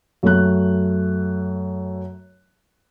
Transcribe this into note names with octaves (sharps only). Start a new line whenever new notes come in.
F#2 A3 F#6